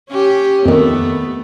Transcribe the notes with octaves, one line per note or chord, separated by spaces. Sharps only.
C#4 G4
F2 D#3 A3 B3